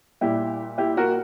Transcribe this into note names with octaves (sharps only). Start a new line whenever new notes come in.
A#2 G3 E4 G4
E4 G4
F#4 A#4